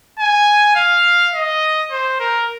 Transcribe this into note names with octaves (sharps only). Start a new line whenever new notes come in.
G#5
F5
D#5
C5
A#4